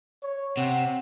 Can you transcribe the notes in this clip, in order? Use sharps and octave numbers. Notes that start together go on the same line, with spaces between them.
C#5
C3 F#5